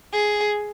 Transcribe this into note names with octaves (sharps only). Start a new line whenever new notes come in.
G#4